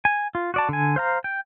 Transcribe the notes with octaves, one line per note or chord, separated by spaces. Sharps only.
G#5
F4
F#4 D5 A5
D3 G#5
C5 F5 A#5
G5